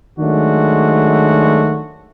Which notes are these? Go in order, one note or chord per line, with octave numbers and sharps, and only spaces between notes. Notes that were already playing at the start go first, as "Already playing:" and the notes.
D#3 F#3 G#3 A3 D4 F#4